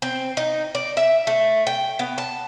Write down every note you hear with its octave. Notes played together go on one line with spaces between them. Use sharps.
C4
D#4
D5
E5
A3
G5
B3
A5